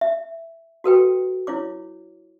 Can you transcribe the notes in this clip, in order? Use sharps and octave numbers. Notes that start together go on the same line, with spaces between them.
E5
F#4 A4 B4 G5
E4 F4 C#5 D6